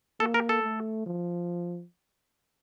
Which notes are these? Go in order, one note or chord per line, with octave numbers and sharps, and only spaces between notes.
A#3 A4
A#4
A4
A3
F3